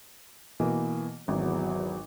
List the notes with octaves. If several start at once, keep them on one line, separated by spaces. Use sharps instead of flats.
B2 E3 A#3
G#1 E2 F#3